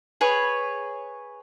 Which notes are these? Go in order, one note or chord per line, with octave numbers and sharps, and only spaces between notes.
G#4 B4 C#5